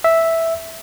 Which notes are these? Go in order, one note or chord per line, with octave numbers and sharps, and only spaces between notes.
E5